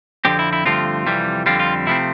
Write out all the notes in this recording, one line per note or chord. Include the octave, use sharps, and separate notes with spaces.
F2 D3 F3 C4 G4
E4
E4
G2 D3 F3 A3 C4 F4
F2 C3 E3 G3
F2 D3 G3 C4 F4
F4
C3 F3 A3 C4 E4